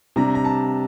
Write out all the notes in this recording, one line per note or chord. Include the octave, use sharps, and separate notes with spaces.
C3 G3 D4 A#5
A#5
A5